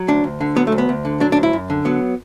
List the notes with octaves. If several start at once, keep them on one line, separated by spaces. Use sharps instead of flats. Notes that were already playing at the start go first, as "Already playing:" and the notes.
Already playing: F#3
D2 D4
D2
D3
F#3 B3
A3
D2
B3
D2
D3
F#3 D4
D4
D2
E4
F#2
D3
F#3 B3